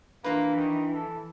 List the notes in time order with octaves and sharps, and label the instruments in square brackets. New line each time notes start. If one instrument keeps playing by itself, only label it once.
[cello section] E3 [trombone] A#3 [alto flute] D4 [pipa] F4 B4
[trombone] D#3
A4